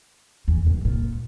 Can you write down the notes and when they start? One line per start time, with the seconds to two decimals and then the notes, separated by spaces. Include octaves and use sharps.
0.48 E2
0.67 F#2
0.85 A#2